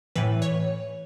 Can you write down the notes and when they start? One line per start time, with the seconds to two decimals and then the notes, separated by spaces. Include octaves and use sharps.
0.16 A2 E3 B4
0.42 C#5